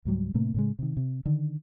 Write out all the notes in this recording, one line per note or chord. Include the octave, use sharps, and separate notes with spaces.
C#2 G#2 F#3 G3
A2 C3 A3 A#3
A2 C#3 G#3
C3 D#3
C3
D3 D#3